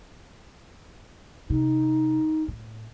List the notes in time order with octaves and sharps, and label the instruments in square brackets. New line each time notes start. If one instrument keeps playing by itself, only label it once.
[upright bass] C3 [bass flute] D#4
[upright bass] A2